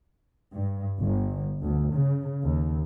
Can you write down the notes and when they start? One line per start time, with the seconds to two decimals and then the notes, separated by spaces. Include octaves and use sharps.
0.53 G2
1.00 G1
1.63 D2
1.95 C#3
2.43 D#2